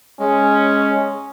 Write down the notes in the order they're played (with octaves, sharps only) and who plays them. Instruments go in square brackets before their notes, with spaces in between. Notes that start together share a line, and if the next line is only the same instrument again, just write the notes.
[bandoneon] G#3 [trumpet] C#4